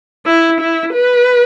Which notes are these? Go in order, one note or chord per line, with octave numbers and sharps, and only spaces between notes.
E4
E4
B4